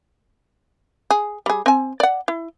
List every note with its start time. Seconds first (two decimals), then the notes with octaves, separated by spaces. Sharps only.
1.10 G#4
1.46 G3 G#4
1.66 C4 G#5
2.00 D5 F#5
2.28 E4